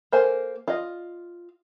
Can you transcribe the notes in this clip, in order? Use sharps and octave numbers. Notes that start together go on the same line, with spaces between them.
A#3 A4 A#4 C5 G#5
F4 D#5